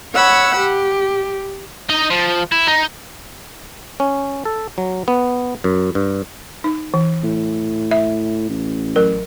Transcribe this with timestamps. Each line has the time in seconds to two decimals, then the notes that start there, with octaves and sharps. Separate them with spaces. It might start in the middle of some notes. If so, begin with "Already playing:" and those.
0.14 C#5 F#5 B5 E6
0.57 G4
1.89 D#4 D#5
2.10 F3
2.52 E4
2.68 D#4
4.00 C#4
4.45 A4
4.78 F#3
5.08 B3
5.64 F#2
5.95 G2
6.64 D#4
6.94 E3
7.23 A2
7.91 E5
8.50 A1
8.96 F#3 A#4